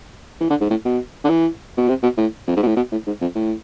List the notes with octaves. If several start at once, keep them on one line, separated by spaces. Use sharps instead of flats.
E3
D3
G#2
A2
B2
D3
E3
B2
C3
B2
A2
F2
G#2
B2
A2
B2
A2
G#2
F2
A2